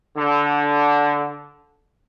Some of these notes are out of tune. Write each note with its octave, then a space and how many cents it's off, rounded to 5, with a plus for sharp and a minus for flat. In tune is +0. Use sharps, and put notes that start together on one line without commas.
D3 -10